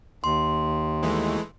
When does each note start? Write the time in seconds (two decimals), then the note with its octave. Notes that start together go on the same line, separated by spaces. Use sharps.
0.24 D#2 C6
1.03 E3 G#3 A3